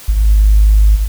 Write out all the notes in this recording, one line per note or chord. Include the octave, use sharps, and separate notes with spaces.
G#1